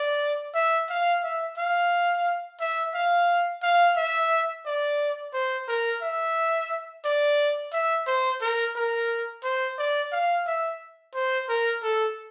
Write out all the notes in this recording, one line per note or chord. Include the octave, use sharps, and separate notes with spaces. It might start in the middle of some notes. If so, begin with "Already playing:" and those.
Already playing: D5
E5
F5
E5
F5
E5
F5
F5
E5
D5
C5
A#4
E5
D5
E5
C5
A#4
A#4
C5
D5
F5
E5
C5
A#4
A4